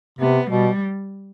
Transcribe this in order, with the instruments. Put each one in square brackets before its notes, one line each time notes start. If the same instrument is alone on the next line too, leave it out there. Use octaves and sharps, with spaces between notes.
[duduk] C3 [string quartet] B3
[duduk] B2 [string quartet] G3